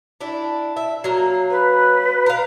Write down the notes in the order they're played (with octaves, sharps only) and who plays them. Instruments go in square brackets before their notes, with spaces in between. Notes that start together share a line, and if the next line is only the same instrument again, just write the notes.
[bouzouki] D4 E4
E5
F#3 A#3
[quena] B4
[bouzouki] A#4 F5